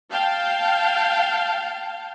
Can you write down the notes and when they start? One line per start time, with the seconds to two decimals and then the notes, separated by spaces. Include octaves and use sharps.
0.11 F5 G5 A5